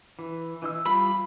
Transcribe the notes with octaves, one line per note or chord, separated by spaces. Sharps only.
E3
E3 D#4 E6
G3 F4 B5